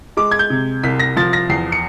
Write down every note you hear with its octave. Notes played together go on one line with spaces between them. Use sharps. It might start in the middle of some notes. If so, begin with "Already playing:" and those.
G#3 D6
G#6
G6
C3
C2 B6
A#6
F3 A6
A#6
E2 C7
C#7